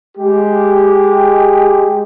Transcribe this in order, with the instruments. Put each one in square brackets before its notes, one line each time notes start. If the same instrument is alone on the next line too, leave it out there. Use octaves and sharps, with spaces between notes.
[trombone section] G#3 G4